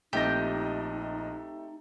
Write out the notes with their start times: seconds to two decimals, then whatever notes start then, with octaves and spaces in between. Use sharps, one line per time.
0.13 A#1 A3 C4 D#4 G4 D#5 A#6